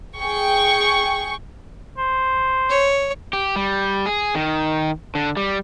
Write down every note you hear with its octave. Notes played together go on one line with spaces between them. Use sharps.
G#4 G5 C#6
C5
C#5
G4
G3
G#4
D#3
D3
G3